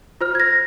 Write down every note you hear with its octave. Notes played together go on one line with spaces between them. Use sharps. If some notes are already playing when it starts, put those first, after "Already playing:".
F4 C5 F6
G#6
A#6